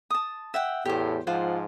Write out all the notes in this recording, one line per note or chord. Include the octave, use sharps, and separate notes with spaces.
A5 D#6
E5 F#5 G5
E2 A2 G4 C5
G#2 F3 F4 C5 F#5